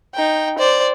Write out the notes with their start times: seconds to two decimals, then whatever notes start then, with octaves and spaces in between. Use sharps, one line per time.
0.15 D#4 G5
0.58 C5 D5